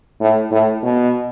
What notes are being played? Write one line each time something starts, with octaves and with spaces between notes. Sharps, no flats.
A2
A2
B2